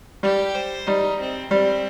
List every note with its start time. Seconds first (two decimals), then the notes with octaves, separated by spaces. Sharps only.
0.23 G3 G4
0.55 C5
0.87 G3 D#4
1.20 C4
1.51 G3 C4